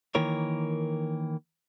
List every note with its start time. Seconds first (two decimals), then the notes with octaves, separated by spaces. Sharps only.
0.15 D#3 E3 A#3 A#4 C#5